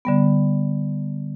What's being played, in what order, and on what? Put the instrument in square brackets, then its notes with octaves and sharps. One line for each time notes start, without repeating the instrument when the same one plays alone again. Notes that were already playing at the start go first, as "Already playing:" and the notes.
[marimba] D3 G3 B3